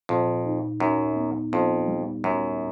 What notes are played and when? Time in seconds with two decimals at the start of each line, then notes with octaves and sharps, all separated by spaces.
0.09 F2 A#2
0.45 D#4
0.80 F#2 D#4
1.16 B3
1.52 F2 B3
1.88 G3
2.24 F#2 G3